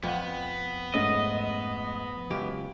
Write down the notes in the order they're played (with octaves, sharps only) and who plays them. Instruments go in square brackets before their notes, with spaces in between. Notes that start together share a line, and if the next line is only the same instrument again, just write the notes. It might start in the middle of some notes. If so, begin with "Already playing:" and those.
[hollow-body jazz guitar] F2 [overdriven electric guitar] B3 [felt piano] F#5 G5
[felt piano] G#2 A3 C#4 [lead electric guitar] D#5
[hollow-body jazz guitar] C#2 F#2 G4